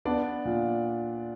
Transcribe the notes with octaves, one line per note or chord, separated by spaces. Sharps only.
B3 D4 D5
A#2